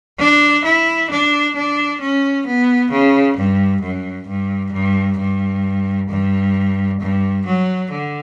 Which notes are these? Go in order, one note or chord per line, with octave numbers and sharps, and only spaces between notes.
D4
E4
D4
D4
C#4
B3
C#3
G2
F#2
G2
G2
G2
G2
G2
F#3
D3